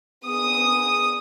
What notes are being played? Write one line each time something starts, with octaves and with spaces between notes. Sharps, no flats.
B3 D4 G#4 D#6